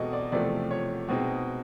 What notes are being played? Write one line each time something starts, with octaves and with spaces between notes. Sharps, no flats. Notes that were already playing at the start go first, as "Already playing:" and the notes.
Already playing: E2 B2 G#3 C4 A4 D#5
D5
E2 C3 F3 A3 D5
C#5
B2 G#3 C4 D#4